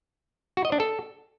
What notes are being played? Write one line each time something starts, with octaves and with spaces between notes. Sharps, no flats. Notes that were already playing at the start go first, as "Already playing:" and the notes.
F#4
D#5
D4
A4